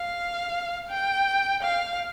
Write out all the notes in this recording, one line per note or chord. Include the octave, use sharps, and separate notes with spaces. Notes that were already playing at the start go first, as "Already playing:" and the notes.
Already playing: F5
G5
F5